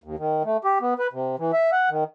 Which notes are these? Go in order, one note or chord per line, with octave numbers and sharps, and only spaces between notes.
D#2
D#3
A3
G4
B3
B4
C3
E3
E5
F#5
D#3